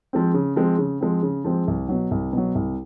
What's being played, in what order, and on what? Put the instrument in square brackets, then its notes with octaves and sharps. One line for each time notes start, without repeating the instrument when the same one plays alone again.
[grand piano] F3 G#3 C4
C#3
F3 G#3 C4
C#3
F3 G#3 C4
C#3
F3 G#3 C4
C2
B2 F#3
C2
B2 F#3
C2